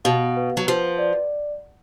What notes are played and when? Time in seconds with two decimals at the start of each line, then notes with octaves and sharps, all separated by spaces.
0.05 B2 F5
0.37 B4
0.57 F#3
0.67 F3 B4
0.98 D5